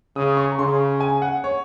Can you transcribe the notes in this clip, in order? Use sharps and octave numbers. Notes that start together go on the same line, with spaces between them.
C#3 D#6
C#6
A#5
C#3 C6
G#5
F#5
C#5